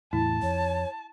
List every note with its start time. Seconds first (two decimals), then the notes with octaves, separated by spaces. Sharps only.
0.13 E2 A2 E4 A5
0.42 F2 C#5